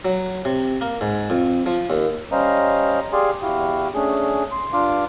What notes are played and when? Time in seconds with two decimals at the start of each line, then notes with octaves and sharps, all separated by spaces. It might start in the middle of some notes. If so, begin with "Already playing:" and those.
0.05 F#3
0.45 C3
0.81 A#3
1.01 G#2
1.30 F2
1.66 F3
1.90 D#2
2.32 G3 C#4 C5 D#5 F5 A#5
3.13 G4 G#4 D5 F5 G#5 C6
3.42 E2 E4 F#4 G4 F5
3.94 A3 C#4 D4 G#4
4.51 C6
4.73 G2 D4 F4 F5 C6 D6